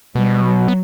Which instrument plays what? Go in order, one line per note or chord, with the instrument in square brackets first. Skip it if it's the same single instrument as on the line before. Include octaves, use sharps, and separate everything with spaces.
[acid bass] B2 [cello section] G3
[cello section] F#3
[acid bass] B3